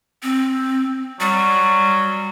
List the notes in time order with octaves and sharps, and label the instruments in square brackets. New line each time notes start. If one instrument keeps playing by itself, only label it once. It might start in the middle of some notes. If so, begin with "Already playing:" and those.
[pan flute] C4
[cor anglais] F#3 [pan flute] G3